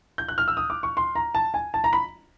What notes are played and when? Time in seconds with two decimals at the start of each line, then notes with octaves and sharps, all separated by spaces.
0.18 G6
0.28 F#6
0.38 F6
0.48 E6
0.57 D#6
0.70 D6
0.83 C#6
0.97 C6
1.15 A#5
1.35 A5
1.54 G#5
1.74 A5
1.84 A#5
1.93 B5